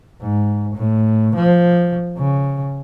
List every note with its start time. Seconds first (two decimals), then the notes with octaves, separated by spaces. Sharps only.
0.22 G#2
0.76 A2
1.36 F3
2.18 C#3